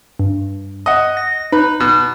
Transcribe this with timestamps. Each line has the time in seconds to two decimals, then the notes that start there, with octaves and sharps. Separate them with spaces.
0.19 G2
0.86 D#5 F#5
1.17 A#6
1.52 D#4 B4
1.80 B2